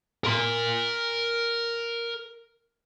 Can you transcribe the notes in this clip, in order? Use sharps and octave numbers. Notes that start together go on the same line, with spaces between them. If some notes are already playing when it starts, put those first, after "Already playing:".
A#4 C6